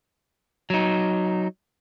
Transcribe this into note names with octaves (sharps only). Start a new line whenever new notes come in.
F#3 D#4